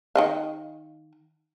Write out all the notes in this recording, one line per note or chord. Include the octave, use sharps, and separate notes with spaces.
D#3 D#5 F5